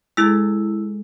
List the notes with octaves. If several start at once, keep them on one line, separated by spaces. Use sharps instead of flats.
G#3 E4 G#4 A4 E6